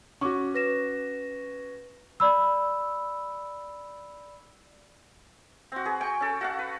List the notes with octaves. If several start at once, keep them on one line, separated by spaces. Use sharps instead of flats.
C#4 F#4 C#6 D6
B4 A#6 E7
D5 B5 E6
C4 F#4
G#4 B4
G5 G#5 C#6
C#4 A4
F#4 F5 F#5
B4